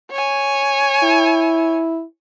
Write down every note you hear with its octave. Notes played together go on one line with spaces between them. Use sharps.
C#5 G#5
E4